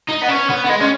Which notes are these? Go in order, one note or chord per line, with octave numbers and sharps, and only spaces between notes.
D#4
B3
C#4
B3
B3
G#3
C#4